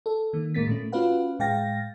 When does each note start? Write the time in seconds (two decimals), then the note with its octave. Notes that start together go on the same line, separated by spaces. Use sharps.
0.06 A4
0.33 D#3 A#3
0.55 A2 G#3 A#3 A6 B6
0.67 A#2 A3 C#4
0.92 C#4 F4 F#4 B4 F5 F#5
1.39 A2 G#3 F5 G5 A6 A#6